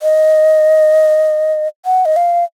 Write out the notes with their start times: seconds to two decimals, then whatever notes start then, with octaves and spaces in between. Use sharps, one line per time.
0.02 D#5
1.85 F#5
2.05 D#5
2.16 F5